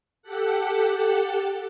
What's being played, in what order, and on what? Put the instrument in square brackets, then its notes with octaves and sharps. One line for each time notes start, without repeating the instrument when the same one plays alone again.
[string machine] G4 A4 F#5